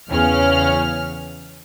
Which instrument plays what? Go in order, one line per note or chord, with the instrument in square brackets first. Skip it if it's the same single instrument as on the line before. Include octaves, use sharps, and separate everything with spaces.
[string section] E2 C#3 C#4 F6